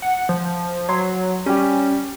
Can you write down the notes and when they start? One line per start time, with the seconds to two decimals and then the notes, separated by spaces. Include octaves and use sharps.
0.02 F#5
0.29 F3
0.89 F#3 C6
1.46 G3 C#4 G4